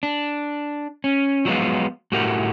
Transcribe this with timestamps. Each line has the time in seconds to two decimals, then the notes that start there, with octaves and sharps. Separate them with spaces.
0.03 D4
1.04 C#4
1.45 F3 F#3 G#3 A3 B3 F4
2.12 A2 A3 F#4 G4 A#4